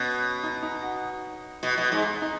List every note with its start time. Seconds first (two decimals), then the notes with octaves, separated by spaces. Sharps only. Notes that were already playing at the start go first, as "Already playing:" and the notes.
Already playing: B2 B3 C#4
0.43 D#4
0.63 D#4
0.82 F#4
1.63 B2
1.78 B2
1.92 G#2
2.22 D#4